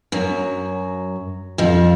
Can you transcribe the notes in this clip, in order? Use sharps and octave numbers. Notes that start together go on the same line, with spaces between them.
F#2 F#3
F2 F3